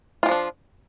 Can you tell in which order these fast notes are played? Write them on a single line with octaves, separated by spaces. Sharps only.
F4 E3 F3 D4